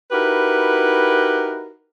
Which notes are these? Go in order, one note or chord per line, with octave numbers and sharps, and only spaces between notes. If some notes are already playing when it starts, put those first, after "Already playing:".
D#4 E4 F#4 G4 A#4 B4